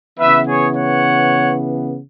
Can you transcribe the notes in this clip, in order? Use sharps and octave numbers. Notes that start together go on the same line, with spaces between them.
C#3 E3 B3 B4 E5
G#4 C#5
C#5 F#5